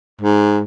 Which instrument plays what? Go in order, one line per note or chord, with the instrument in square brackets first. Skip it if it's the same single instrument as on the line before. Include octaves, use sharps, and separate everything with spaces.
[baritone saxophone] G#2